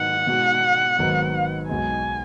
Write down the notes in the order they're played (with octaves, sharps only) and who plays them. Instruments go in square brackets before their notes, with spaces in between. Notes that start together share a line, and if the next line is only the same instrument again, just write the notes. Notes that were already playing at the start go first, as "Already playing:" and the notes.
Already playing: [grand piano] G#2 D#3 F#3 B3 D#4 [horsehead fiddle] F#5
[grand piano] B2 G#3 D#4 F#4
G#1 G#2 D#3 F#3 B3
[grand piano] B1 B2 G#3 [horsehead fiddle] G#5